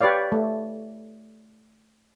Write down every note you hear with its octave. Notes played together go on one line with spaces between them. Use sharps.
G4 B4 C#5 D5 F5
A3